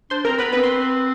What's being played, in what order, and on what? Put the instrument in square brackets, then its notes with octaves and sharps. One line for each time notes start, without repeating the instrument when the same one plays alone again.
[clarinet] D4 [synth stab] C5 C6
[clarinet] C4 [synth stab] A#4 A#5
[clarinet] B3 [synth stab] B4 B5
[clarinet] C4 [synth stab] B4 B5
[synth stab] C6